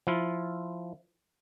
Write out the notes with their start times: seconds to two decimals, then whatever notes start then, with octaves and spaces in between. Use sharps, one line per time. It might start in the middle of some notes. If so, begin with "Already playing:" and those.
0.07 F3 E4 F4